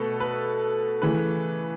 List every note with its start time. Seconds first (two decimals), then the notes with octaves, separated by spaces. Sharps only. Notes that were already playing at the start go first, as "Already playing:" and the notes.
Already playing: B2 A3 A4 B4
0.20 B4
1.02 C#3 E3 A3 B4